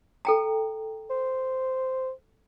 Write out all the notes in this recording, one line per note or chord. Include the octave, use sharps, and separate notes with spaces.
A4 G5 A#5
C5